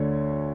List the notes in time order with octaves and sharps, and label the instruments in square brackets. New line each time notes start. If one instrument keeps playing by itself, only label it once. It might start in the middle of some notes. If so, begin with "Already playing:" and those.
Already playing: [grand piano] D2 D3 C#5